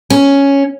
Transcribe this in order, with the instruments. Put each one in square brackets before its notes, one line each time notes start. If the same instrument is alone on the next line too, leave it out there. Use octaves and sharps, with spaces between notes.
[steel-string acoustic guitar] C#4